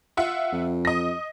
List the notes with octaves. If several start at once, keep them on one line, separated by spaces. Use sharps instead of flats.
F4 E5 F#5
F2
D#5 A#6